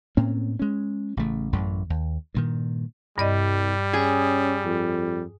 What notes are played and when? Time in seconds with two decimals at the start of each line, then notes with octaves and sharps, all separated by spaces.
0.17 A2 A#3 C4 C#4
0.59 G#3 C#4
1.17 A1 C#3 A3
1.53 A1 F#2 A3
1.90 D#2
2.34 G2 A#2 D#3
3.18 C2 G2 G3 D5 D#5
3.93 C#4 G#4
4.64 F2